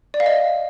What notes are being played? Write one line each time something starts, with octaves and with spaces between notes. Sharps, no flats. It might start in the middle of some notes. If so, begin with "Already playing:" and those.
D5
F5
D#5